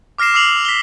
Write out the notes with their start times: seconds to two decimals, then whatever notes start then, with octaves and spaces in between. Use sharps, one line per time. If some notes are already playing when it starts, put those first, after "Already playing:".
0.18 D6 F6 A#6 C7 E7
0.34 D6 E6 C7 F7 F#7
0.65 B6 G7